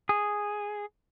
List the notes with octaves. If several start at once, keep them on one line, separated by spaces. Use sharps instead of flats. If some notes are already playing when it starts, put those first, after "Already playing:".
G#4